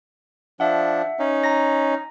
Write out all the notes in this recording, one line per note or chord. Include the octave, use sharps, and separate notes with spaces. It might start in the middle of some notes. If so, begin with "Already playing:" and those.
F3 D4 E5 F#5
C#4 D#4
A#5 A#6